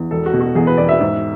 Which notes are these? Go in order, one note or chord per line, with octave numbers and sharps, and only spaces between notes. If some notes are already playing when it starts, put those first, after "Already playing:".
Already playing: E2
E1 A4
F#4
B2
F#4
E2 G#4
B4
E1 D5
E5
G#2